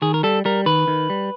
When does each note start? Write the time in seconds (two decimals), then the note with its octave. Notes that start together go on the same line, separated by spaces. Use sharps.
0.02 D#3 G#4
0.14 A#4
0.23 G3 A4
0.45 G3 A#4
0.66 D#3 B4
0.88 D#3
1.10 G3